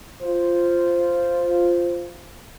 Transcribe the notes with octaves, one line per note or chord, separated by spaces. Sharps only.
F4 C5